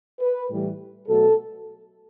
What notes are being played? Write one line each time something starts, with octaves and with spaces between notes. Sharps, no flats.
B4
A2 E3 G3
B2 F#3 A3 A4